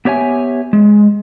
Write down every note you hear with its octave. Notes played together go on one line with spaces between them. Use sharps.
B3 G4 C#5 E5 G#5
G#3